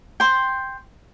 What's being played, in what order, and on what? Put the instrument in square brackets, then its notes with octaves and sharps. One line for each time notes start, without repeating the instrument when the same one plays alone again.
[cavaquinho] G5 C6